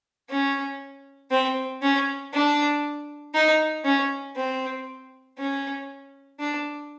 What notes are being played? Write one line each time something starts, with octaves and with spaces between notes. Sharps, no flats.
C#4
C4
C#4
D4
D#4
C#4
C4
C#4
D4